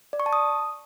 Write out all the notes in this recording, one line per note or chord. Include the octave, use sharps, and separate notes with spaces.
D5
C#6
A5
D#6